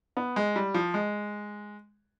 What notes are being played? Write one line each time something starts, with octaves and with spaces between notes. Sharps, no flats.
B3
G#3
G3
F3
G#3